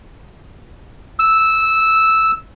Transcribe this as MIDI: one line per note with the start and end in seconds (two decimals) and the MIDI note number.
1.19 2.31 88